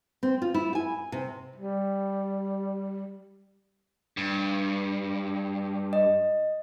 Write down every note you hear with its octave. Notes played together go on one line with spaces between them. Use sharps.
C4
F4
E4
G#5
C3
G3
G2
D#5